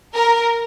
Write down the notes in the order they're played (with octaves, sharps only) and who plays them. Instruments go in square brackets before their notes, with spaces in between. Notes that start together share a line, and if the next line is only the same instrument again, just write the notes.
[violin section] A#4